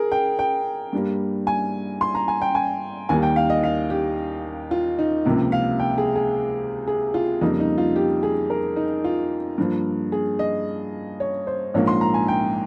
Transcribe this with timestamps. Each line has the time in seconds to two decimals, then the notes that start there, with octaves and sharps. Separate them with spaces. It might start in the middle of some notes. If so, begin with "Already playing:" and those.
Already playing: G#4 A#4
0.12 G5
0.39 G5
0.93 G2 G3 A#3
1.47 G#5
2.01 C6
2.15 A#5
2.28 G#5
2.42 G5
2.55 G#5
3.09 D#2 D#3 G3 A#3 G#5
3.23 G5
3.36 F5
3.50 D#5
3.63 F5
3.90 G4
4.71 F4
4.99 D#4
5.25 C#2 C3 F3 A#3
5.52 F5
5.80 G5
5.98 G#4
6.16 G#4
6.88 G#4
7.14 F4
7.41 F2 C#3 G3 A#3 D#4
7.60 D#4
7.78 F4
7.96 G4
8.23 G#4
8.50 A#4
8.76 D#4
9.04 F4
9.58 G2 F3 A#3
10.12 G#4
10.39 D#5
11.20 C#5
11.47 C5
11.74 A#1 G#2 F3 A#3 C#5
11.87 C6
12.01 A#5
12.14 G#5
12.28 G5